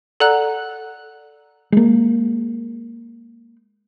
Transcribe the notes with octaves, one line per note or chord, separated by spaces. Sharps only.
A4 D5 F#5 A#5 F#6
G#3 A#3